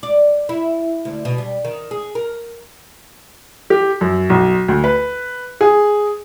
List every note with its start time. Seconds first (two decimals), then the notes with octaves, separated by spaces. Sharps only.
0.03 D5
0.49 E4
1.05 D2
1.25 B2
1.38 G3
1.65 D#3
1.91 G#4
2.15 A#4
3.70 G4
4.01 F#2
4.30 B1
4.68 D2
4.84 B4
5.61 G#4